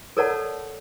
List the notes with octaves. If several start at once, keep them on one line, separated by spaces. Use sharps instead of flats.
A4 A#4 C#5 D5 F#5 A5